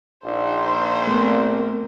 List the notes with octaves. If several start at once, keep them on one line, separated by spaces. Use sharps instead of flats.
A#1 D#4 C5
A3 B3 C4 A#4